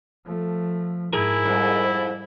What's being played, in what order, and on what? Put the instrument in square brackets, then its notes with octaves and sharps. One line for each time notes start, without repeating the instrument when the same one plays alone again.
[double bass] F3 A3
[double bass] G#2 [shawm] E4 [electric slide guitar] G#4 A#4
[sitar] F2 G#2 [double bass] G3